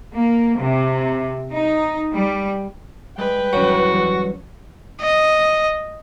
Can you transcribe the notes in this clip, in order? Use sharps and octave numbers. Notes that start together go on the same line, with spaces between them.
A#3
C3
D#4
G3
G3 G#3 B4 G5 F#6
G#1 E2 F#3 C#4 F#4 C#5
E3 G3
D#5